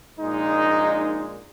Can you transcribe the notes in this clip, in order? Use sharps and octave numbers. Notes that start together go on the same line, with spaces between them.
A#1 A#2 G#3 D#4